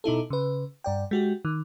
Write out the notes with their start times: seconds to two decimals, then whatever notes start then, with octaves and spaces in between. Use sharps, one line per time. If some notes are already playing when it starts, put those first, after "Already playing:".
0.04 B2 D#4 E4 A4
0.30 C#3 B4
0.84 G2 D5 G5
1.11 G#3 F#4 G4
1.45 D#3